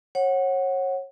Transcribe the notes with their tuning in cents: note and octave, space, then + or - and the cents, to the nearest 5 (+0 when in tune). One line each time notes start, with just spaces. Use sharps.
C#5 -30 F#5 +0